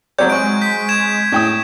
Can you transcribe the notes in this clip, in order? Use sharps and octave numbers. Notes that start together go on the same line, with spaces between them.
F#3 G3 C4 C#5 G6
G#3 C#6 D7
G6 B6
G#6 E7
A2 G5 D#6